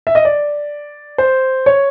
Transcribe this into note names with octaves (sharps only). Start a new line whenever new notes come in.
E5
D#5
D5
C5
C#5